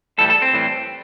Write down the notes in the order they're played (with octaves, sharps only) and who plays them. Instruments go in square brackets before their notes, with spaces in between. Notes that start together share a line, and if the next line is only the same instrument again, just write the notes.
[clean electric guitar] A2 E3 G3 A4
A4
C4
A2 E3 G3